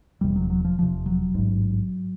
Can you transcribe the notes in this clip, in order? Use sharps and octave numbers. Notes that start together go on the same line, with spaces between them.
F1 E2 C3 G3
F#3
F#3
F3
F1 E2 C3 F3
F#3
A1 G#2